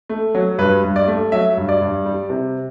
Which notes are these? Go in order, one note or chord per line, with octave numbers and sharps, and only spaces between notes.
A3
F#3
G2 B4
G2
D5
A3
F#3 E5
G2
D5
G2
G3
C3